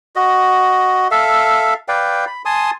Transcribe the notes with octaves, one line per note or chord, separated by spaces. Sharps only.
F#4 D#5
A4 E5 F5
B4 D5 F5 G5
B5
G#5 A5 C6 D#6